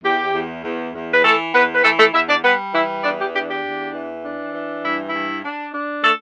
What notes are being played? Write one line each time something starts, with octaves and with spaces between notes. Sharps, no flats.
E2 G4
E2
E2
E2
B4
E3 A3 A4
E2 B3 B4
B4
E3 A3 A4
A3 A4
E2 E4 E5
D4 D5
G3 B3 B4
E3 E4 E5
E2 D4 D5
G4
D4 G4
G4
E2
E3
D4
E3
G2 E4
G2 E4
D4
D4
A3 A4